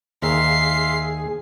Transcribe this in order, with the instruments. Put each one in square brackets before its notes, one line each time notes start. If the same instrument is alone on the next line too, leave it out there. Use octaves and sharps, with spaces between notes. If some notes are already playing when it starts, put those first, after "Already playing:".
[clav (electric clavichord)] D#2 A#5 [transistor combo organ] G#4 [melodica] E5 F5 C6 [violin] C7